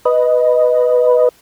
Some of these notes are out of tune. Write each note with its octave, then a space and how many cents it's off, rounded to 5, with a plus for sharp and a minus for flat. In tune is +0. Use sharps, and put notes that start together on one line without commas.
B4 +0 D#5 +0